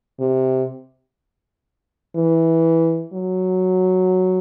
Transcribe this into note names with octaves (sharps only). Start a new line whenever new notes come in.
C3
E3
F#3